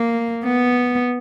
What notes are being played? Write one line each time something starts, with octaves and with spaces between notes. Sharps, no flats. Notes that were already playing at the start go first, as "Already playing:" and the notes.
Already playing: A#3
B3